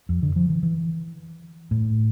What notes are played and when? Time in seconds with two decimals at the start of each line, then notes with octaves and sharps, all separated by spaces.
0.09 F2
0.23 D3
0.36 F3
0.50 E3
0.63 E3
1.71 A2